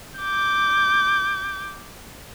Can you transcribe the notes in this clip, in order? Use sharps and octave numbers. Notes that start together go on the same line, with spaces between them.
D6 G6